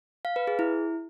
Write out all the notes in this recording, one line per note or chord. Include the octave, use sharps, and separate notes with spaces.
F5
B4
G#4
E4